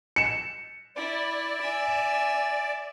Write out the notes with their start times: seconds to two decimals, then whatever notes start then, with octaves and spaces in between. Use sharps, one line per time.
0.16 C#7 E7
0.96 E4 D5
1.62 E5 G#5